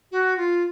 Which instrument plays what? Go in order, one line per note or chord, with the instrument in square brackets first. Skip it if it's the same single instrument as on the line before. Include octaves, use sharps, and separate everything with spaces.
[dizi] F#4
F4